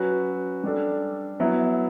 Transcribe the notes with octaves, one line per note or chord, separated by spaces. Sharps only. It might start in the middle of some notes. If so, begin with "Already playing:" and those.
Already playing: F#3 C#4 F#4 B4
G3 D4 A4
F#3 B3 E4